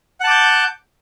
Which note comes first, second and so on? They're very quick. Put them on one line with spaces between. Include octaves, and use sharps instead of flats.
F#5 A5 D6 G6